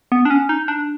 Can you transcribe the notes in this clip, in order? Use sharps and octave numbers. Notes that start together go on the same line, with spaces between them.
B3
D4
C#4
D#4
D4